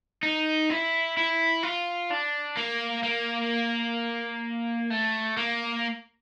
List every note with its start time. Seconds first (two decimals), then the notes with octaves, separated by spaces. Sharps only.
0.23 D#4
0.70 E4
1.17 E4
1.63 F4
2.11 D4
2.57 A#3
3.03 A#3
4.90 A3
5.37 A#3